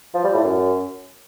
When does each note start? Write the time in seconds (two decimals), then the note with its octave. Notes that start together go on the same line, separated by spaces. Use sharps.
0.14 F3
0.24 G3
0.34 A2
0.44 F#2